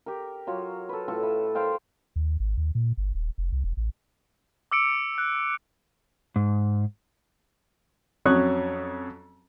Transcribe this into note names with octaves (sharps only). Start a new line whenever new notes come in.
G4 A#4
F#3 F4 C#5
A4 B4
A2 F4 A4 C#6
B4 E5
A#4 C5 F5 G5
D#2
G#1
D#2
A#2
G1
D#1
F1
C2
E1
A1
D6 E6 C#7 D7
F#6
G#2
F2 F#3 C#4 C#6 D#6 F#6